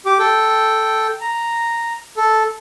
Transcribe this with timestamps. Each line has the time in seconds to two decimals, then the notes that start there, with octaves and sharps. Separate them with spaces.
0.06 G4 D6
0.19 A4 G5
1.21 A#5
2.17 A4